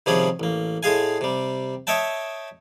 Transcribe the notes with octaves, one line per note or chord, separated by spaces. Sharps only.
C3 D#3 F3 G3 C#4 G#4
A1 A#3
A2 G#3 G#4 F5 G#5
C3 G3
C#5 D#5 E5 G5 A5